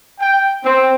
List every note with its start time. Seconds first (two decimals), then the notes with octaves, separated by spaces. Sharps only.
0.19 G5
0.62 C4